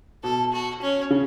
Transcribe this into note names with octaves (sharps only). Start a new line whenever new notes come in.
B2 A4
F#4
C#4
C#3